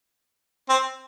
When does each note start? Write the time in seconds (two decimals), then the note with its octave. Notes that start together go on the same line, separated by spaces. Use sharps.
0.69 C4